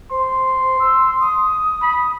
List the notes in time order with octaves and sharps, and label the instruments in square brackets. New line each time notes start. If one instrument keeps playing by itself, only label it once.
[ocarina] C5 [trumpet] C6
[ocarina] E6
D#6
[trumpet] B5